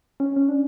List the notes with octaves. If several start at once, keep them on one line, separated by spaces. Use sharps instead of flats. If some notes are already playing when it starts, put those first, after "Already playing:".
C#4
C#4
D4